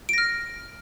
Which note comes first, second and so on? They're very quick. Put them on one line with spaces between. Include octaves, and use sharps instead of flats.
D7 A#6 F6